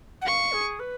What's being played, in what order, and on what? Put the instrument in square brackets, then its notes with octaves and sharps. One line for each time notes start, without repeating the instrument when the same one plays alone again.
[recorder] F#5
[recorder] F5 [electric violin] C#6
[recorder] G#4
B4